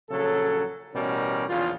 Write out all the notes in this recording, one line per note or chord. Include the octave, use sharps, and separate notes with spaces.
A#1 C#3 F#3 A4
A1 B2 G3 C#4 A#4
A#1 E2 C#3 F4